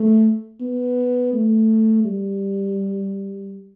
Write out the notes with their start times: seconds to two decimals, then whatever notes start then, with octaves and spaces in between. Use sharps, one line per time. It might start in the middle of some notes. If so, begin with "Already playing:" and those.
Already playing: A3
0.60 B3
1.33 A3
2.04 G3